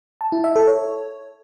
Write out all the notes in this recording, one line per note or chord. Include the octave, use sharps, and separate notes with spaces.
A5
E4
E5
A4
C#5